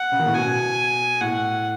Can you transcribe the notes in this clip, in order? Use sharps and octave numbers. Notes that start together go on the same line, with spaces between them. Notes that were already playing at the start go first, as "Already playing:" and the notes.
Already playing: F#5
C#3
D#3
A2 C#3
B2 G#5
A2 F#5